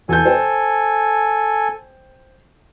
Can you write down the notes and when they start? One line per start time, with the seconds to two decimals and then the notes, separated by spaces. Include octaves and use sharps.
0.09 E2 A4 G#5 G6
0.25 C5 G5